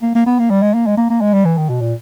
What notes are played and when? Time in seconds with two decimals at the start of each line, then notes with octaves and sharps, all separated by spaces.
0.02 A#3
0.15 A#3
0.26 B3
0.39 A#3
0.50 G3
0.62 G#3
0.74 A#3
0.86 G#3
0.97 A#3
1.10 A#3
1.21 G#3
1.33 G3
1.45 E3
1.57 D#3
1.69 B2
1.81 A#2